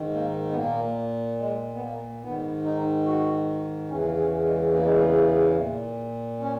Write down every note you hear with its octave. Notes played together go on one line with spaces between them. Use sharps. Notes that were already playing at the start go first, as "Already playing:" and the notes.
Already playing: G#2 D#3
A#3
B3
A#2 A#3
G#3
B3
A#3
G#2 B3
D#3
D#4
F#4
E2 C#3 E3 C#4
C#4
G#3
A#3
G#3
A#3
A#2
C#4